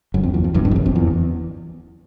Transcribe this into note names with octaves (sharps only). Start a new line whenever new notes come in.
F#1 F#2
F2
E2
F2
G1 G2
G1 G2
F2
F#1 F#2
F2
E2